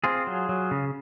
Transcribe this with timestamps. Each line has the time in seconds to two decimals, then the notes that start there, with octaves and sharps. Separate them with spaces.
0.04 C4 F4 G#4
0.27 F#3
0.49 F#3
0.71 C#3